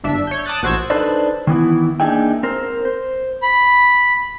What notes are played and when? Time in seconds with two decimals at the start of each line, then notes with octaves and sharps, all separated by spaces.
0.04 G1 D4 E5
0.27 C#5 G6
0.46 A5 D6 D#6 F#6 A6
0.63 A#1 F#4 C5 E6 G#6 E7
0.90 D4 D#4 A4 B4 C5 D5
1.47 D#3 E3 B3 E4
2.00 A#3 D4 D#4 G#4 E5 G5
2.43 C4 A#4 C5
2.85 C5
3.42 B5